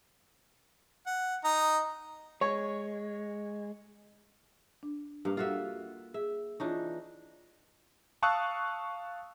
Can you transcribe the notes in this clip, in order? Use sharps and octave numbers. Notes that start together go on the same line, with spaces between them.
F#5
D#4 A#5
G#3 C#5
D4
G2 A#3
F4 F#4 A4 E5
G#4 E5
E3 D4 D#4 F4 C#5 C#6
F5 A5 C#6 D#6 E6 F#6